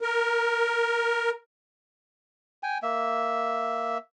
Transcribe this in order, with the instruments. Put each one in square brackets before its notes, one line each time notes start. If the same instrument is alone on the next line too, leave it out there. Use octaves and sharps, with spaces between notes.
[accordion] A#4
[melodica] G5 G#5
A#3 E5